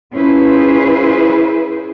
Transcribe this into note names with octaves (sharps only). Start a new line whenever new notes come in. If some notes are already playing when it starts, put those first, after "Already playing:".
C#4 E4 F4 G#4 B4 C5